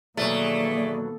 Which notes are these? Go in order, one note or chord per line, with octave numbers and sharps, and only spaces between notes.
E2 B2 D#3 F#3 A3 A#3 G#4 D5